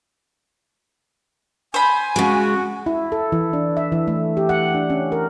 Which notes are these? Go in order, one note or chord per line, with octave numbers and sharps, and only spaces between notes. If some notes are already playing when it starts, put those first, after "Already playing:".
C5 G#5 B5
C#3 G#3 F#4
E4
A4
E3
D4
E5
E3
A3
G4
F#5
D4
C#4
A#4